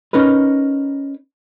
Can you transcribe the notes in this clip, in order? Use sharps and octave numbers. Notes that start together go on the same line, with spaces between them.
C#4 D#4 A#4 B4